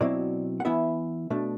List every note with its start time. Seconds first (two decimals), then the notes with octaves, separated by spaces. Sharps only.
0.01 B2 F#3 C4 E4 D5
0.60 F#5
0.65 E3 B3 E4 E5
1.30 B2 A3 D4